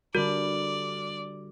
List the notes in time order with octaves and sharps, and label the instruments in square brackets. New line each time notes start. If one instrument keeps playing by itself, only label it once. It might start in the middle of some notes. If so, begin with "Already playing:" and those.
[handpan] D3 G3 [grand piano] D4 A#4 [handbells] F#4 [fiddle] D5